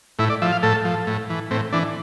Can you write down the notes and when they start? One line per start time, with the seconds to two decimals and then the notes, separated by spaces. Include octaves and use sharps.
0.19 A2 E4
0.30 D5
0.42 F3 E5
0.52 F5
0.63 A2 A4
0.85 F3
1.07 A2
1.30 E3
1.51 A2 C4
1.72 E3 D4